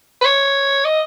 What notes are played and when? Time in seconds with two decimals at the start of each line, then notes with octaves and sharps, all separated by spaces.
0.21 B4
0.25 C#5
0.85 D#5